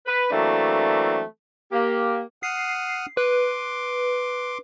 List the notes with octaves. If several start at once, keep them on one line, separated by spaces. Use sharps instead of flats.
B4
E3 F#3 A3 A#3 C4 D4
A#3 G4
F#5 D#6 F6 C7
B4 C6 D6